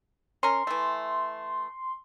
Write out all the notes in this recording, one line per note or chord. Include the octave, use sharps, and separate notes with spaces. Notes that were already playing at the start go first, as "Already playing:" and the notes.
C#4 A#4 C6
E3 A3